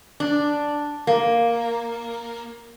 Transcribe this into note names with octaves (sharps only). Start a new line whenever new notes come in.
D4
A#3